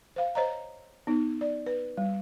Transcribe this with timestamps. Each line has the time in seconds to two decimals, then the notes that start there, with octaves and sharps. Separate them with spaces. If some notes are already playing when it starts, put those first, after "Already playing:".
0.16 C5 F5
0.35 C5 C#5 D#5 A#5
1.07 B3 D#4
1.41 D5
1.66 B4
1.97 G3